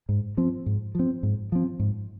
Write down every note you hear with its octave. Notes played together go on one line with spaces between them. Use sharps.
G#2
F3 C4
G#2
F3 C4
G#2
F3 C4
G#2